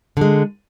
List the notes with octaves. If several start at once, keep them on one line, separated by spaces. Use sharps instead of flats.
D3 G#3